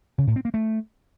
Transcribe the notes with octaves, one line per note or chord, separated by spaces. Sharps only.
C#3
A2
C4
A#3
A3